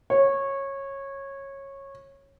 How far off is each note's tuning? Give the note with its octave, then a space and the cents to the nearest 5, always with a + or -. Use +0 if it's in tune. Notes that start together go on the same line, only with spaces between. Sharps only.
C#5 -15